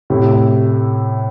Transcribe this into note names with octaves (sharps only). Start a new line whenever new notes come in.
A2 C3